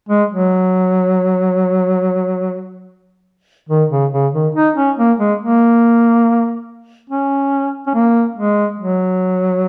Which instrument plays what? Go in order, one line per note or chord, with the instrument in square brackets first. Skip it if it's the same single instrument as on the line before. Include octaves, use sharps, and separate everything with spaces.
[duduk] G#3
F#3
D#3
C#3
C#3
D#3
D#4
C#4
A#3
G#3
A#3
C#4
C#4
A#3
G#3
F#3